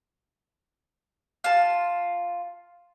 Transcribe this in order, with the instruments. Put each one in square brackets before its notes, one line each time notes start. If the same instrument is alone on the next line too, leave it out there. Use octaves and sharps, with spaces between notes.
[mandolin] F4 A5